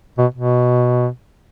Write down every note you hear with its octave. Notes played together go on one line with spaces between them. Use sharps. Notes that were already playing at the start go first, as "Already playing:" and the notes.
B2
B2